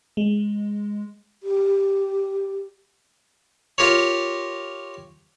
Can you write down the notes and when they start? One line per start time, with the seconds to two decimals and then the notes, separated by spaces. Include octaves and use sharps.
0.17 G#3
1.43 G4
3.78 F4 G4 A#4 C#5